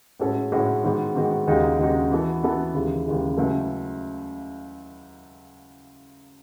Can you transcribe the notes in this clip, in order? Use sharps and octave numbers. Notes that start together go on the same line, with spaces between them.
A2 G#3 C#4 F#4 A4
A2 G#3 C#4 F#4 A4
G#2 D#3 G#3 B3 F#4
G#2 D#3 G#3 B3 F#4
D#2 C#3 G#3 D#4 F#4
D#2 C#3 G#3 D#4 F#4
E3 B3 F#4 A4
E3 B3 F#4 A4
D#2 C#3 E3 G#3
D#2 C#3 E3 G#3
C#2 C#3 F#3 A3 E4